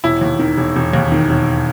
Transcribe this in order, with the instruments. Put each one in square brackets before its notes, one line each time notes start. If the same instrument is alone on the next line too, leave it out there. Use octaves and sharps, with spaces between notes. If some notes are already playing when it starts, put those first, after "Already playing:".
[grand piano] E1 E4
D#2
D#3
E1
E1
D#2
D#3
E1